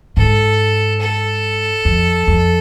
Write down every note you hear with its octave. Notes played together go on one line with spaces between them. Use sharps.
G#2 A4
A4
F2
F2